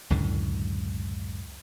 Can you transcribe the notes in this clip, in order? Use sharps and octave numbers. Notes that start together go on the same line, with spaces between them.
C#2 F#2 A2 D3